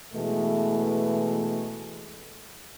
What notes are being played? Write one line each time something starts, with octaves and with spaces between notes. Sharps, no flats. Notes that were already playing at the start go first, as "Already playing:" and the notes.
B2 E3 G#3 A3